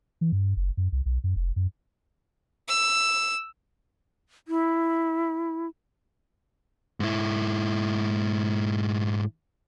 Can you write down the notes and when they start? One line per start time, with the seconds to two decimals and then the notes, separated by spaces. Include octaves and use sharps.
0.21 E3
0.32 G2
0.57 F#1
0.77 F#2
0.92 C2
1.06 B1
1.24 F#2
1.36 F1
1.56 F#2
2.68 E6
4.48 E4
7.00 G#2 E4